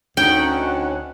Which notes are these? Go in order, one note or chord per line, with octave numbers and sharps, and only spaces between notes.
D2 C#4 D#4 F#5 G5